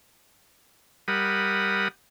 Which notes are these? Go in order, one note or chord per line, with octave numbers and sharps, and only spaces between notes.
G3 A#4 F#5 B5 D#6